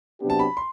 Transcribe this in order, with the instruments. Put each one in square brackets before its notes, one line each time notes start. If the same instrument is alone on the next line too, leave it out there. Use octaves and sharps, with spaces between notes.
[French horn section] C3 F#3 B3 D4 G4
[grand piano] A5
B5
C6